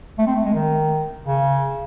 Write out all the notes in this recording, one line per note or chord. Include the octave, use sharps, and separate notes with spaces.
A3
C4
A3
G#3
D#3
C#3